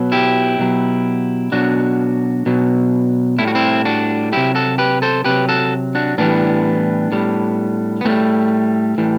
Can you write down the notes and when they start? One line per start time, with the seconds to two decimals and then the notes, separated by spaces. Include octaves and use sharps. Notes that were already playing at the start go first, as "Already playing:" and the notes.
Already playing: B2 F#3
0.12 E4 G4
0.59 B2 F#3
1.52 B2 F#3 D4 F#4
2.46 B2 F#3
3.39 A2 G3 E4
3.48 F#4
3.55 C4 E4
3.85 D4 F#4
4.32 C3 F#3 E4 G4
4.55 F#4 A4
4.78 G4 B4
5.02 A4 C5
5.24 C3 F#3 G4 B4
5.49 F#4 A4
5.95 D4 F#4
6.18 A2 E3 G3 B3 D4
7.12 A2 G3
8.01 B3
8.05 A2 A3 C4
8.09 G3
8.98 A2 E3 G3